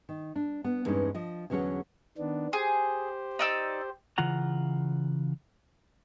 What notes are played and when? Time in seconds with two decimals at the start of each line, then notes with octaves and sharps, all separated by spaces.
0.09 D#3
0.36 D4
0.64 B3
0.85 E2 G2 G#3 C4 C#4 D#4
1.14 F3 D#5
1.50 E2 D3 F#3 C#4 G#4 C#5
2.18 D#3 B3 D4
2.53 G4 G#4 C5
3.39 D#4 D5 E6
4.18 C#3 E3 F4 F#5 A#5